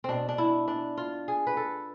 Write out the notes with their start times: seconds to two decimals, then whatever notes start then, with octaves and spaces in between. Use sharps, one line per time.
0.04 B2 C4 D4
0.29 D4
0.38 E4
0.68 D4
0.97 F4
1.28 G#4
1.47 B4
1.57 A4